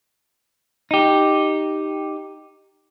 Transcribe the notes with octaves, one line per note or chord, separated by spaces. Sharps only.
D#4 G4